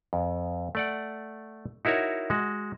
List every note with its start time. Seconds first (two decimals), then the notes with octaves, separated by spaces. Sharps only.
0.13 F2
0.75 A3 D5 F#5
1.85 D#4 E4 F#4 A#4 C#5
2.30 G#3 F#4